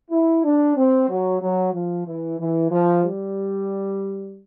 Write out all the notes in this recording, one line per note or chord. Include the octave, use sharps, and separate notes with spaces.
E4
D4
C4
F#3
F#3
F3
E3
E3
F3
G3